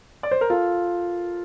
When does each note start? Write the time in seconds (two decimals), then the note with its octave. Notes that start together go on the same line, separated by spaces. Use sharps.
0.23 D5
0.31 C5
0.41 A#4
0.50 F4 A4